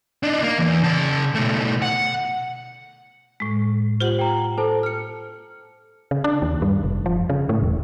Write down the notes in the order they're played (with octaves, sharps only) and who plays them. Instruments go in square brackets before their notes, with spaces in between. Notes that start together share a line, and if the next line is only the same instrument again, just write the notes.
[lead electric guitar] D4 D#4
A#3
E2
C#3 A5
B2 A3
F#5
[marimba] A2 G#3
[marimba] F4 G4 F#5 [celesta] C5 F#7
[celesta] G5 A#5
A4 C5 A5
F6 C#7
[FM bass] C#3
D4
D#2
G2
F1
F3
C#3
A2
E1